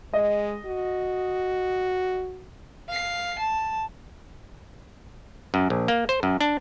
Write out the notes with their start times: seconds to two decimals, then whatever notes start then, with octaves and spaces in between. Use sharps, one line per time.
0.13 G#3 D#5
0.65 F#4
2.89 F5 C7
3.39 A5
5.54 F#2
5.70 A#1
5.88 A#3
6.09 C5
6.23 F#2
6.41 D4